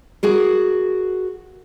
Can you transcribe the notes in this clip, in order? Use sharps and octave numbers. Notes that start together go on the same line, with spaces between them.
F#4 G#4 A#4